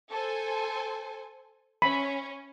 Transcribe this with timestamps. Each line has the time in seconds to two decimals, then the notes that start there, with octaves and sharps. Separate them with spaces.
0.11 A4 C5 G#5
1.82 C#4 B5